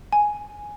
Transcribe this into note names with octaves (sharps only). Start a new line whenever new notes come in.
G#5